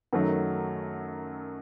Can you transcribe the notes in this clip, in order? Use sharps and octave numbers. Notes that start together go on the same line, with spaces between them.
F#2 D#3 F#3 A3